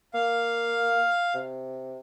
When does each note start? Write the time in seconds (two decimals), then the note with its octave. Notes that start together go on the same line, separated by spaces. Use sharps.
0.14 A#3 F5
1.34 C3